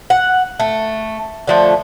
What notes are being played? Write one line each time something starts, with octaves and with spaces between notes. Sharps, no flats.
F#5
A3
D3 F3 A3